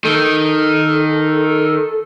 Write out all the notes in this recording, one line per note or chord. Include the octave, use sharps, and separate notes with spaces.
D#3 A4